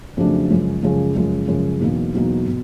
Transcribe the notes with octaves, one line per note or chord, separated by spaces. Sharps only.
F2 C#3 F#3 A3 D4
F#2 C#3 F3 G#3
F#2 C#3 F3 G#3
F#2 C#3 F3 G#3
F#2 C#3 F3 G#3
E2 B2 F#3 A#3 D#4
E2 B2 F#3 A#3 D#4
B2